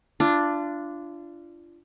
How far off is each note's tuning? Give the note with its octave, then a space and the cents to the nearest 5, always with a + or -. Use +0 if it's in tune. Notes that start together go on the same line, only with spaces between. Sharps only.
D4 +0 F4 -30